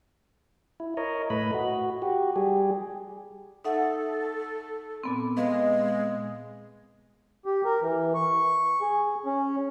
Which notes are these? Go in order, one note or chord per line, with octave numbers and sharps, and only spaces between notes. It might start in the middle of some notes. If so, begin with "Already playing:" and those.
E4
A#4 C#5 D#5
A2 A3 B4 D#5 B5
F#4
F#4 G4
G3 G4 G#4
D#4 A4 E5 F#5
A#2 B3 C4
G#3 B4 D#5 F5
G4
A#4
E3
C#6
G#4
C#4